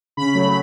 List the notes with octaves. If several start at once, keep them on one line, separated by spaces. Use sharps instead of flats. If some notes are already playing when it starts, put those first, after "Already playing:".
C#3 B5
F#3 A3